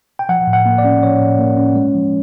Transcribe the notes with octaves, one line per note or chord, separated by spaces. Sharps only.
G5
F3 F#5
A2
F#5
A#3
D5
C#4
F3 C#5
A2
A#3
C#4
G#3
F3